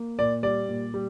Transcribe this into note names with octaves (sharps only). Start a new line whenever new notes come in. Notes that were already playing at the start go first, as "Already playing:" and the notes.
Already playing: A#3
A#2 D5
G3 D5
A#2
G3